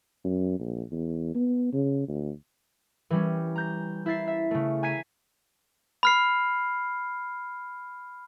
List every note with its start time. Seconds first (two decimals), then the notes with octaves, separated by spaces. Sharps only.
0.25 F#2
0.59 A#1
0.92 E2
1.35 B3
1.73 C#3
2.08 D2
3.10 E3 G3 C#4
3.56 A#5 G6 A#6
4.06 E4 E5 A6 C7
4.28 E5
4.51 C#3 A3
4.83 G#5 A#5 G#6 B6 C7 D#7
6.03 B5 F6 C7